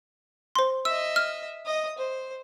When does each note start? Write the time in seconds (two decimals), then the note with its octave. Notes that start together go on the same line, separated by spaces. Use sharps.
0.56 C5 C6
0.85 D#5 E5 E6
1.16 F6
1.66 D#5 D#6
1.98 C5